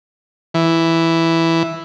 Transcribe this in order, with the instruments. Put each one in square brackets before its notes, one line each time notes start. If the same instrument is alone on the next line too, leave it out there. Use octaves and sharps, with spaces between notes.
[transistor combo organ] E3